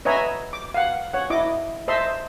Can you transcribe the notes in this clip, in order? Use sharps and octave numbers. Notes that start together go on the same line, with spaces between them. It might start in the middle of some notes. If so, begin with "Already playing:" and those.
B4 C#5 D#5 E5 G#5 A#5
D6
F5 F#5
C#5 F#5
E4 D#5 D6
C5 D#5 E5 A5 C6